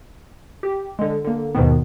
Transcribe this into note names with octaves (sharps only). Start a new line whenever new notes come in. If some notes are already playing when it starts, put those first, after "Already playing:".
G4
D3 G#3
D3 A#3
D#2 G#2 B2 D#3 B3